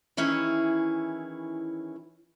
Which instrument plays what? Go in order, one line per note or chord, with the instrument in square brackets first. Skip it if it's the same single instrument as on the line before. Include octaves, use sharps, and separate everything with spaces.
[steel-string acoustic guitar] D#3 E3 C#4 E4 G#4 C#5